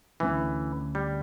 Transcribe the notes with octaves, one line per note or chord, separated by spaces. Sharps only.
D2 D3 E3 A3 C#4
G3